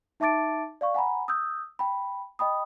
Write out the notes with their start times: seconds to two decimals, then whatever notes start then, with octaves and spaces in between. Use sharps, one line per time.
0.20 D#4 E5 A5 D6 A6 D7
0.81 D5 F5 C#6
0.94 F#5 G#5 A#5 B5
1.28 D#6 E6 G6
1.79 G5 B5
2.39 D#5 G5 B5 D#6